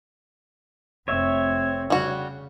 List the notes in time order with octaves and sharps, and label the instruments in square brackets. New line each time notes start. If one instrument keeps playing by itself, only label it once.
[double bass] F1 C4 [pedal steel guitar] C#5 E5
[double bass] C#3 [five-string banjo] G3 F#4